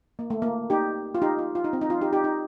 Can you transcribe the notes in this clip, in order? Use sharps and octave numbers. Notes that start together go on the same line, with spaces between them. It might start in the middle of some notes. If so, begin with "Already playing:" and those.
A#3
A3
A#3
D#4 G4
F4
D#4 G4
F4
F4
D#4
C4
D#4
F4
D#4 G4
D#4 G4
D#4